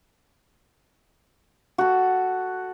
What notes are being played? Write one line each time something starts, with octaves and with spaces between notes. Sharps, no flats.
F#4 A4